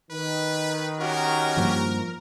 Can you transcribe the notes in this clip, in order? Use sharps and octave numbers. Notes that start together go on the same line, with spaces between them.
D#3 B4
C#4 F#4 G4 A#4
G2 F3 A#3